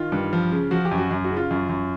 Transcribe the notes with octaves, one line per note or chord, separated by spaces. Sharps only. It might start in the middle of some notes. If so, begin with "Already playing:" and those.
Already playing: D#3 F4
G2
F3
C#3
F3 F#4
G4
F#2
F#4
F#2
F#4
C#3
F4
F#2
F#2